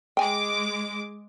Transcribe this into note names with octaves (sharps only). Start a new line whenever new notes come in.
G#3 G5 G#5 D6